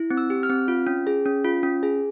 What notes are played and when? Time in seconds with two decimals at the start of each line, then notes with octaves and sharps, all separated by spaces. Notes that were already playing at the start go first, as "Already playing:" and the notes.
Already playing: E4
0.10 C4
0.17 E6
0.30 G4
0.43 F6
0.50 C4
0.68 F4
0.87 C#4
1.07 G#4
1.25 C#4
1.44 F4
1.63 C#4
1.83 G#4